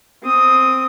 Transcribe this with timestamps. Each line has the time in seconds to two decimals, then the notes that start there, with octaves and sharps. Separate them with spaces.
0.22 C4 D#6